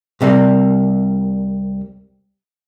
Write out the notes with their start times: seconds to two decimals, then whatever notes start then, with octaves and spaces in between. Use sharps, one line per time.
0.21 C2 C3 G3 A#3